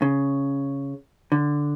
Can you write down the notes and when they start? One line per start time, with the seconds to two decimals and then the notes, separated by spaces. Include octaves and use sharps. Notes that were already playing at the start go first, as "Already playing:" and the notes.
0.02 C#3
1.32 D3